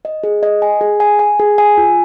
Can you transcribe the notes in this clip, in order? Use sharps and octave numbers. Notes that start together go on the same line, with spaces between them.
D#5
G#4
D#5
G#5
G#4
G#5
G#5
G#4
G#5
F4